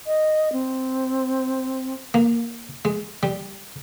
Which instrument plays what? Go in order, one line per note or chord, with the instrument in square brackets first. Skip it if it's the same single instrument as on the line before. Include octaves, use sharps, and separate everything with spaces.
[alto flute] D#5
C4
[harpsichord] A#3
G#3
G3